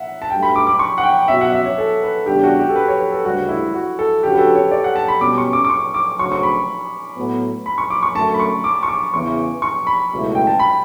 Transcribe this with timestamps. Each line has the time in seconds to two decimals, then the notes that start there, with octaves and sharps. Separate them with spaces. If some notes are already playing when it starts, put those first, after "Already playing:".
Already playing: E5 F#5
0.22 A5
0.30 G2 F#3 A3 G5
0.43 B5
0.56 D6
0.67 D6
0.79 C#6
0.98 F#5
1.03 G5
1.28 B2 F#3 C#4 F#4 E5
1.41 F#5
1.53 E5
1.66 C#5
1.78 A4
2.03 B4
2.26 E2 C#3 G3 D4 G4
2.44 F#4
2.60 G4
2.69 A4
2.76 B4
2.88 C#5
3.00 B4
3.12 A4
3.25 D2 C#3 G3 F#4
3.49 E4
3.74 F#4
3.99 A4
4.23 D3 F#3 C#4 F#4 G4
4.34 B4
4.38 A4
4.55 C#5
4.71 D5
4.84 F#5
4.96 A5
5.08 B5
5.20 B2 G3 C#4 D6
5.38 C#6
5.53 D6
5.65 D6
5.70 C#6
5.94 D6
6.18 D2 C#3 F#3 C#6
6.32 C#6
6.43 B5
7.17 A2 F#3 B3
7.66 B5
7.78 C#6
7.90 D6
8.03 C#6
8.15 F#2 D3 A3 A5
8.34 B5
8.40 C#6
8.64 D6
8.83 C#6
8.88 D6
9.13 E2 C#3 E3 C#6
9.62 C#6
9.87 B5
10.11 C#2 B2 F#3 A3 E4
10.35 G5
10.47 A5
10.59 B5